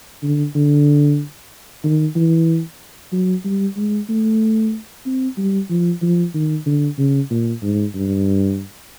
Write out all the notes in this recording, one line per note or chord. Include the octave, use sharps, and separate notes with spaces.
D3
D3
D#3
E3
F#3
G3
G#3
A3
C4
G3
F3
F3
D#3
D3
C#3
A#2
G#2
G2